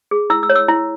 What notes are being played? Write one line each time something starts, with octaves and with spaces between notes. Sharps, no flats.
G#4
E4 E6
E6
C#5
E6
E4